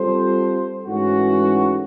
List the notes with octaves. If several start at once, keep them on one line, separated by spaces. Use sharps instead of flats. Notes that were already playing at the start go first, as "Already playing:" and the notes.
Already playing: G3 C4 F4 A4 C5
G#2 E3 A3 C#4 F#4